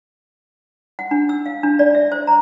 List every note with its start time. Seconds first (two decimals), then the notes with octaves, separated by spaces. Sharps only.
0.99 F#5
1.11 D4
1.29 E6
1.46 F5
1.63 D4
1.79 D5
1.95 E5
2.12 C5
2.27 A#5